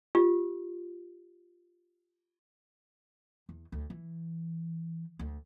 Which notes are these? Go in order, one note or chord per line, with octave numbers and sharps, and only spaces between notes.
F4 G4
E2
D2
E3
D2